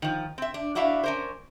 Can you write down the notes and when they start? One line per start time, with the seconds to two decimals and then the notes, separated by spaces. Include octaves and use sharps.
0.02 D#3 F3
0.38 C4 E5
0.54 D4
0.75 D4 E4 F#4 E5 F5
1.03 C#4 A#4 C5